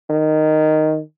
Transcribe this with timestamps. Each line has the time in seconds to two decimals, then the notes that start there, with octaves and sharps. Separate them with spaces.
0.10 D#3